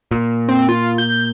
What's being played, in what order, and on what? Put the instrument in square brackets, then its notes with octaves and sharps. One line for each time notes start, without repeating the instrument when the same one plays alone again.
[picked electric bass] A#2
[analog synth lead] C4
F4
G6